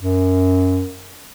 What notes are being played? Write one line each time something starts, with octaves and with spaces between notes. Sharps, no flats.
F#2